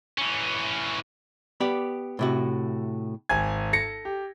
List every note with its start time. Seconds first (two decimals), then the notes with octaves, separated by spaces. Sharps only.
0.18 E3 C#4
1.60 B3 G4 D5
2.19 A2 C3 F#4
3.29 G#1 G#5 G#6
3.73 A4 A#6 C#7
4.05 G4